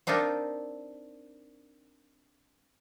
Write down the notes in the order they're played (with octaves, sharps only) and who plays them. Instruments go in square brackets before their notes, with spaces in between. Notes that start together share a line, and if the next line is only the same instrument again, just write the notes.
[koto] C4 D4 D#4 F4 A#4